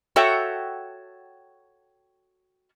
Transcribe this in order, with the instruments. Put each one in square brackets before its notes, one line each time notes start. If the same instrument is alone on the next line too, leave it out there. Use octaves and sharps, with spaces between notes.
[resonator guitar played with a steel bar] F#4 A4 C#5 E5 F#5 G5